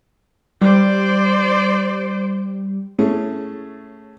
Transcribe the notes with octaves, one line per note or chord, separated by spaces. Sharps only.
G3 C5 D5
A2 A3 C#4 G#4